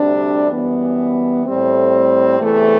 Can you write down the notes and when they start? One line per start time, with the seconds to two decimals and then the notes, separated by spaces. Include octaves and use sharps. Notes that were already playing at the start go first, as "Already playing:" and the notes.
Already playing: D2 C3 G3 D4
0.51 F#2 E3 G3 B3
1.46 A2 G3 C4
2.39 E2 C3 E3 A3